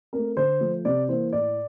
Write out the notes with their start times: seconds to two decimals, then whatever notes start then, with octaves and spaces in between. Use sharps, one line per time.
0.13 A3 C4 A#4
0.37 D3 C5
0.60 F3 A3
0.85 C3 D5
1.09 E3 A#3 C5
1.33 A2 D5